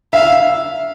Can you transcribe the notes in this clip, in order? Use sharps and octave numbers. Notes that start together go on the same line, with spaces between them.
E5 F5